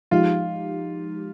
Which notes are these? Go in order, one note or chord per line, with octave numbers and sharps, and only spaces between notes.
F3 G#3 D#4 F4 G4